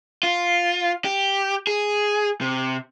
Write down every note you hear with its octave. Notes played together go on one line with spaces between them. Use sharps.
F4
G4
G#4
C3